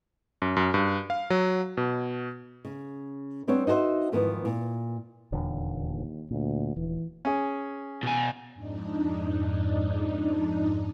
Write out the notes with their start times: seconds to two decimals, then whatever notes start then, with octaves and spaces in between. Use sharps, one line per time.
0.42 F#2
0.57 F#2
0.74 G2
1.10 F5
1.30 F#3
1.77 B2
2.65 C#3
3.47 G3 B3 C4 D4 C#5
3.67 D#4 F#4 A4 C5 E5
4.12 E2 G#2 D#3 F3 B3
4.45 A#2
5.32 D#1 E2 D3
5.77 D#2
6.31 D2 A#2
6.76 D#1 E3
7.25 C#4 G#4
8.03 B2 G#5
8.53 F2 G#2 D4 D#4